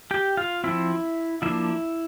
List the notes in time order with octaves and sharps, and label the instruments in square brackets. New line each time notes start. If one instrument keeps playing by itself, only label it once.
[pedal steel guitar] G4 G5
F4 F5
F3 C4 E4 E5
F3 A#3 D4 E4 E5